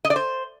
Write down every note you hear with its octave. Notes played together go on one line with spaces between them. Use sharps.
D#5
D5
C5